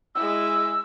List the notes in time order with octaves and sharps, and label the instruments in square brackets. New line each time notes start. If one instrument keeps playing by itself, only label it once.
[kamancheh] G#3 E4 [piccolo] E6